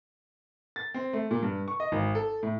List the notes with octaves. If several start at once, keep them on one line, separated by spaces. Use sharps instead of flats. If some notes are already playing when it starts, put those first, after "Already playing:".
A6
C4
A3
A#2
G2
C#6
D#5
G#1
A4
A2